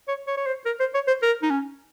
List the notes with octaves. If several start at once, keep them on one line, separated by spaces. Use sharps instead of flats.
C#5
C#5
C#5
C5
A#4
C5
C#5
C5
A#4
D#4
C#4